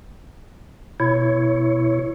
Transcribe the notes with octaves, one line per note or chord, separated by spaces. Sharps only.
B2 E4 C#5